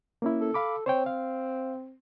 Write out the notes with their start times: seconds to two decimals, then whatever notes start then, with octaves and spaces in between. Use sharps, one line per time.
0.22 A#3 C#4 E4
0.41 A4
0.54 F5 B5 D6
0.86 C4 C5 C#5 G5
1.06 F5